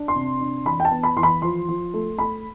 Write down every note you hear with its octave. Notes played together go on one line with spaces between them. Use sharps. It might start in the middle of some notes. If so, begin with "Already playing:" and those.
Already playing: D4
C6
C3
D4
E3 B5
G5
A5
B3
B5
E3 C6
B5
F3 C6
F3
A3
A3 B5